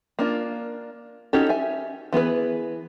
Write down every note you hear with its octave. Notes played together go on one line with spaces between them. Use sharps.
A#3 D4 F4
C#4 D#4 F#4 G4 A4
E5 G#5
E3 B3 G#4 B4